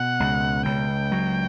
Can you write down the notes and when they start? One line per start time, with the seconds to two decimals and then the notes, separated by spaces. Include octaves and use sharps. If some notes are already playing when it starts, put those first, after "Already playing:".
Already playing: B2 F#5
0.20 C#2
0.65 C#2 G5
1.12 F#3